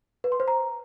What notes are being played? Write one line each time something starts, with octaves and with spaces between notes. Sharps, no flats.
B4
C6
C5
A#5